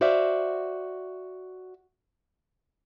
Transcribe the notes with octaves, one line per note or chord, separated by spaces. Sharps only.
F#4 C5 D5 E5 F5